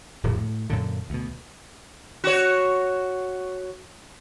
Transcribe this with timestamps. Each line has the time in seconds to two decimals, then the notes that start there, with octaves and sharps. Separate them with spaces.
0.23 D1 F2 A#2
0.37 A2
0.70 F#2 A#2 D3
1.10 D2 B2
2.24 F#4 C#5